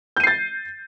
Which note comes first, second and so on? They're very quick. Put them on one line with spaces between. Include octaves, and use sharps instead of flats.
G6 D#7 C7 A6